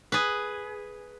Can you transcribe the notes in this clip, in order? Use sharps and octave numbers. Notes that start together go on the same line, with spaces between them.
G#4 B4